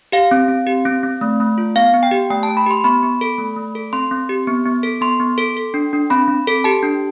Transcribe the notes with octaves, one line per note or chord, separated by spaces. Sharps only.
G4 F5
C4
C4
G4
C4
C4
A3
A3
F4
B3 F5
B3
G5
G4
A3 G5
A5
A3
B5
G4 C6
B3 B5
B3
A4
A3
A3
A4
C4 C6
C4
G4
B3
B3
A4
B3 C6
B3
A4
A4
D4
D4
C4 B5
C4
A4
G4 A5
D4